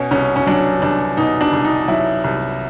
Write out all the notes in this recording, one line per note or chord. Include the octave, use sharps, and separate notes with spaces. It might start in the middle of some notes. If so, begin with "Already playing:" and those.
Already playing: B2 C#4
C2 C#4
C#4
F#3 D4
C2 D4
B2 D#4
D4
C2
D#4
F#3 E4
C2